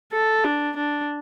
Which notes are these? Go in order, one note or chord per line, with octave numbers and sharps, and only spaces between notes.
A4
D4
D4